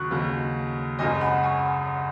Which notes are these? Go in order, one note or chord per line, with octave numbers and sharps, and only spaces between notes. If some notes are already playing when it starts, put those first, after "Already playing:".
Already playing: D#2 C#3 F#3 C#6 F#6
D#2 C#3 F#3
G#1 F#2 C#3 D#5 G#5
F#5 B5
G#5 C#6